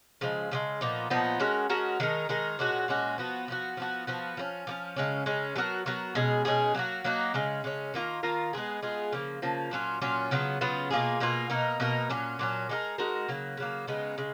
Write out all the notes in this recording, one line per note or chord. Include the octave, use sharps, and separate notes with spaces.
C#3 F3 G#3
C#3 F3 G#3
A#2 F3 B3 D#4
A#2 F3 B3 D#4
G#3 C#4 F#4 A#4
G#3 C#4 F#4 A#4
D#3 G#3 D#4 A#4
D#3 G#3 D#4 A#4
A#2 G#3 C#4 F#4
A#2 G#3 C#4 F#4
F3 B3 F#4
F3 B3 F#4
F3 B3 F#4
F3 B3 F#4
F3 A#3 C#4
F3 A#3 C#4
C#3 G#3 C#4
C#3 G#3 C#4
F#3 B3 F#4 A#4
F#3 B3 F#4 A#4
B2 G#3 C#4 G#4
B2 G#3 C#4 G#4
F#3 A#3 D#4 F#4
F#3 A#3 D#4 F#4
C#3 G#3 C#4
C#3 G#3 C#4
D#3 A#3 F4 A#4
D#3 A#3 F4 A#4
G#3 B3 F4 G#4
G#3 B3 F4 G#4
C#3 F3 A#3
C#3 F3 A#3
A#2 F#3 C#4 F4
A#2 F#3 C#4 F4
C#3 F#3 B3 F4
C#3 F#3 B3 F4
B2 A#3 F4 G#4
B2 A#3 F4 G#4
B2 A#3 D#4 A#4
B2 A#3 D#4 A#4
A#2 F#3 C#4
A#2 F#3 C#4
G#3 D#4 F#4 A#4
G#3 D#4 F#4 A#4
C#3 F#3 A#3
C#3 F#3 A#3
C#3 G#3 B3 D#4
C#3 G#3